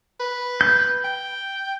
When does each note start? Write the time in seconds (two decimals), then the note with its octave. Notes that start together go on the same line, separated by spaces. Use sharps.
0.20 B4
0.61 G6
1.04 G5